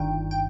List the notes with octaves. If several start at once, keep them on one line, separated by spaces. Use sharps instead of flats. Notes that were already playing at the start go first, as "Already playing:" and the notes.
Already playing: G1 G2 D#3 G5
G5